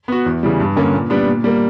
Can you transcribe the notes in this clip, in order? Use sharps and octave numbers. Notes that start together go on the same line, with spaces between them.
B3 F#4
E2
C#3 E3 G3
G2
D3 A#3 C#4
A#2
G3 B3 D4
A#2
G3 A#3